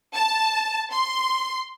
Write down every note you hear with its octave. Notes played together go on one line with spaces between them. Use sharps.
A5
C6